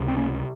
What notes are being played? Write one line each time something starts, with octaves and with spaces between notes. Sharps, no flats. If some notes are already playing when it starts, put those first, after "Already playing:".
Already playing: C#2 C3
C4
A#3 C#4